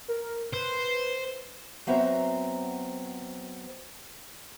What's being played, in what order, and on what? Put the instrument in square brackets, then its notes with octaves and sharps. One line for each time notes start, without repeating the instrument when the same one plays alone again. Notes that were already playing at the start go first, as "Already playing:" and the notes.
[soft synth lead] A#4
[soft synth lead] B4 [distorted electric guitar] C5
[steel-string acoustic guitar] F#3 B3 C4 E5 A#5